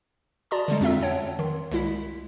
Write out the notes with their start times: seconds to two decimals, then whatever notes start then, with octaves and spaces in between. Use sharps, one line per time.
0.51 F#4 D5 A5 A#5 C6 D#6
0.68 D3 G3 G#3
0.81 F2 C4 F4 E5 E6
1.02 C#5 F#5 G5 A5
1.39 D#3 C6
1.71 C2 G#3 E4 B6